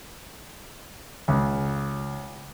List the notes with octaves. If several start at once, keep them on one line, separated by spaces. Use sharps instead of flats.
C#2